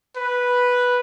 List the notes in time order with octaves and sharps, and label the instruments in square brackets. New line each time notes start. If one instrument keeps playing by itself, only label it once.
[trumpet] B4